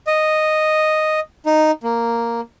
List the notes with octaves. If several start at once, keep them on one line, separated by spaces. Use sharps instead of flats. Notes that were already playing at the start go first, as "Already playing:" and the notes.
D#5
D#4
A#3